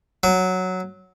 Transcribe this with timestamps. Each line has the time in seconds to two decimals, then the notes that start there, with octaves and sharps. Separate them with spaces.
0.23 F#3